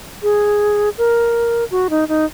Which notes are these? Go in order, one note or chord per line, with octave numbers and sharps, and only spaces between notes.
G#4
A#4
F#4
D#4
D#4